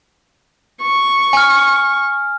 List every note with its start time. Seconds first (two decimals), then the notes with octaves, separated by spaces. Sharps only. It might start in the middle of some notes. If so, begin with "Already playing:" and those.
0.82 C#6
1.33 G#5 F6